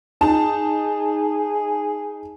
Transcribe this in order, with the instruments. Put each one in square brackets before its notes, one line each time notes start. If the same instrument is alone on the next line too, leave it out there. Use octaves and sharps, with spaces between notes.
[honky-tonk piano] D#4 A5 [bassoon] G#4